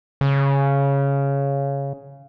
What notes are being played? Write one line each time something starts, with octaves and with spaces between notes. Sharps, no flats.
C#3